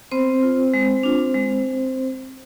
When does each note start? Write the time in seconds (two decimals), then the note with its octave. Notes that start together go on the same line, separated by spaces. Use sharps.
0.11 B3 C4 C5
0.43 F4
0.74 G#3
1.03 D4 F4
1.34 G#3